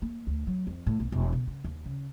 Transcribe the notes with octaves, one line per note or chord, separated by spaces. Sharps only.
A#3
D2
F#3
F2
A2
B1
E1
B2
C#3
D#2
C#3